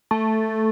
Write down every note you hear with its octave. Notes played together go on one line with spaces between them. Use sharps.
A3